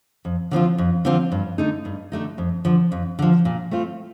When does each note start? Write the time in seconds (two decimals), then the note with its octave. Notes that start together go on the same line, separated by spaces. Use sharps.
0.25 F2
0.51 D3 F3 C4 F4
0.78 F2
1.05 D3 F3 C4 F4
1.32 G2
1.58 D3 A3 D#4
1.85 G2
2.12 D3 A3 D#4
2.38 F2
2.65 D3 F3
2.92 F2
3.19 D3 F3
3.45 A#2
3.71 A3 C4 F4